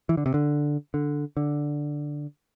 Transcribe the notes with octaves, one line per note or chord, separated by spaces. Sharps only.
E3
D3
C3
D3
D3
D3